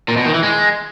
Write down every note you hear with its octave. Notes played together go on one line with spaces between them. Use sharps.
A#2
B2
D#3
E3
G#3